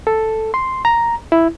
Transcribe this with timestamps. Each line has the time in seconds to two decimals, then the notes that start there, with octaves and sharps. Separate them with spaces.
0.07 A4
0.54 C6
0.85 A#5
1.32 E4